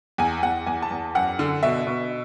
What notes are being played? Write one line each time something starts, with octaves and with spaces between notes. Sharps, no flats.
E2 G#5
E2 F#5
E2 G#5
A5
E2
F#2 F#5
D3
B2 E5
B2